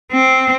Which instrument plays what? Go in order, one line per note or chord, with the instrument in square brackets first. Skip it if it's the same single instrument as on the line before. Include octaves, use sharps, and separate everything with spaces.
[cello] C4